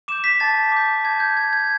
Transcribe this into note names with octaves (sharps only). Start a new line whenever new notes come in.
D6 G6 E7
B6
A5 A6
D6 G6
A5 G#6
G6
D6 G6 G#6
G#6